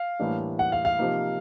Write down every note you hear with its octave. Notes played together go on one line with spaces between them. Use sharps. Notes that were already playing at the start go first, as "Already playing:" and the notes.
Already playing: F5
A2 E3 G3 A#3 D4
F#5
F5
F5
C3 F3 A#3 D#4